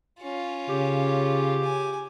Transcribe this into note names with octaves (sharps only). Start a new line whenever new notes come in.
C#4 F4
C#3 G4
G#5